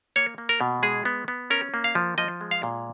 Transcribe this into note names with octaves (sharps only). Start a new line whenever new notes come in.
A#3 C#5
A#3
A#4
B2
G#3 G#4
B3
B3
C#4 A#4
A#3
F5
F3
F3 D#5
G#3
F5
A#2